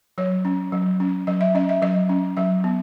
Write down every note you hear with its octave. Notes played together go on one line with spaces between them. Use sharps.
F#3 C#5
C#4
F#3
C#4
F#3 D#5
E5
C#4 D#5
E5
F#3 D#5
C#4
F#3 E5
B3